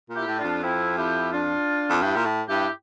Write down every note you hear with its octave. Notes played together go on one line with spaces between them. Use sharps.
A#2
E4 G4
A2
D4 F4
F2
C4 E4
E4 G4
D4 F4
F2
G2 E4 G4
A#2
A2
G2 E4 G4